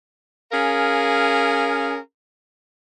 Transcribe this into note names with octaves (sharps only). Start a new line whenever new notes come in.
C#4 G#4 A#4 F5